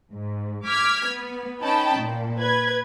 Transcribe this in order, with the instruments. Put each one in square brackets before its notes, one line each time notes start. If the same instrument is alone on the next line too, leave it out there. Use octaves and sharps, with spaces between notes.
[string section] G#2
D6 F6 G#6 B6
B3
C#4 D#4 G5 A5 B5
A#2
B4 G#6